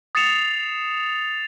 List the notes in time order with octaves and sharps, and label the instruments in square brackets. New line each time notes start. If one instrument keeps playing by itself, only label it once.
[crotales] D#6 A6 C7 C#7 E7 F7